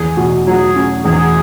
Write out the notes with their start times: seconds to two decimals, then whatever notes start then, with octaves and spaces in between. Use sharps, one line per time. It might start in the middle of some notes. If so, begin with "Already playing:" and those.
Already playing: E2 G#4
0.17 B2
0.47 F#3 G#4
0.76 C#4
1.05 E2 G#4